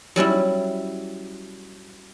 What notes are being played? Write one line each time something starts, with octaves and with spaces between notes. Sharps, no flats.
F#3 G3 C#4 E4